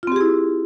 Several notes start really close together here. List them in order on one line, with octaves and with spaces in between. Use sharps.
F4 C4 G4 G#4 E4